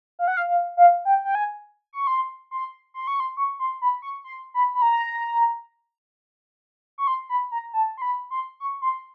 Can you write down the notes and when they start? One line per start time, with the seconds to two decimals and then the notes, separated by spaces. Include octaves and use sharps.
0.19 F5
0.28 F#5
0.37 F5
0.48 F5
0.77 F5
1.05 G5
1.25 G5
1.35 G#5
1.93 C#6
2.07 C6
2.51 C6
2.94 C6
3.07 C#6
3.20 C6
3.37 C#6
3.60 C6
3.82 B5
4.02 C#6
4.24 C6
4.54 B5
4.75 B5
4.82 A#5
6.98 C#6
7.07 C6
7.29 B5
7.52 A#5
7.73 A5
7.98 C6
8.02 B5
8.31 C6
8.60 C#6
8.82 C6